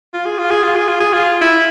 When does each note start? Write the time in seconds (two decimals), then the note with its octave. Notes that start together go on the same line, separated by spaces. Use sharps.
0.13 F4
0.26 G#4
0.38 F4
0.51 G#4
0.63 F4
0.75 G#4
0.88 F4
1.00 G#4
1.13 F4
1.41 E4